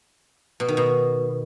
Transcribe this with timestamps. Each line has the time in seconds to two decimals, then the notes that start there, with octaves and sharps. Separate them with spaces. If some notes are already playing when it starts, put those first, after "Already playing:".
0.60 B2
0.68 D#3
0.77 B2